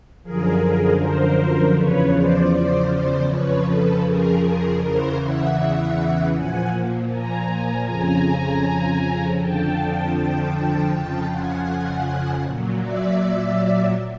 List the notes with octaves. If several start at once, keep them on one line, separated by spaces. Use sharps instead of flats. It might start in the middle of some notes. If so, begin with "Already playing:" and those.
F#2 D3 F3 G#4 A#4
A#4 C5
E2 C#3 F3 B4 C#5
C5 D5
C5 D5
C5 D5
F2 C#3 F3 B4 C#5
A4 B4
G#4 A#4
G#4 A#4
E2 C#3 E3 A#4 C5
E5 F#5
A#2 F3 F#5 G#5
G#5 A#5
F2 C#3 F3 G#5 A#5
F2 D3 F3 G5 A5
G5 A5
G5 A5
F2 C#3 F3 G5 A5
F#5 G#5
A#2 F#3
D5 E5